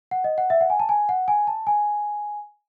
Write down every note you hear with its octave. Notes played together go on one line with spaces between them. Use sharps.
F#5
D#5
F#5
E5
F#5
G#5
A5
G#5
F#5
G#5
A5
G#5